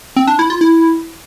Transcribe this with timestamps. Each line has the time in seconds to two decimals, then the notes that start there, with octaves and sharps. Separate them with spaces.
0.16 C4
0.27 D4
0.39 E4
0.50 F4
0.61 E4